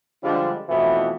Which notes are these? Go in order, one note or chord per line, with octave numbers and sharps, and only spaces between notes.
D3 F3 G3 G#3 D4
F2 B2 E3 A3 B3 E4